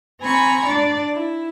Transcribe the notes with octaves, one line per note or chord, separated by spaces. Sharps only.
C4 G#5 A#5 B5 C#6
D4 D5
E4